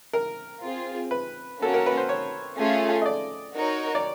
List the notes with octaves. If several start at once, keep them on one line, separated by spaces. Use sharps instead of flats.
A#4
C4 F4 G#4
B4
A#3 C#4 F#4 A4
A#4
B4
C5
C#5
A3 C#4 F4 G#4
D#5
D5
D#4 F#4 A#4 C#5
D5